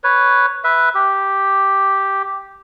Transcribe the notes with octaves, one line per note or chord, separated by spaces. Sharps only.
B4 C#5
B4 E5
G4